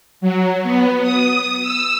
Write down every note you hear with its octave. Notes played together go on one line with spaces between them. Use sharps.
F#3
B3
D#6
E6